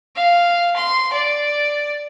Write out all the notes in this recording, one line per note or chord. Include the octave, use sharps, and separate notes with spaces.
F5
C6
D5